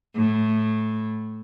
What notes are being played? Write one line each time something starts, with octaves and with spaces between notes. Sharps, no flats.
A2